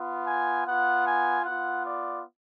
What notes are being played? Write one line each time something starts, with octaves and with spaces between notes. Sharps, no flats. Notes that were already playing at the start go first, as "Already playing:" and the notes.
Already playing: B3 F4
G#5
B3 F4 F#5
G#5
B3 F4 F#5
D5